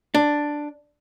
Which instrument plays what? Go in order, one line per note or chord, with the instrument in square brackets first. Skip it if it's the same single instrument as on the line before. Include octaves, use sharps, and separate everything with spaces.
[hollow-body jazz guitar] D4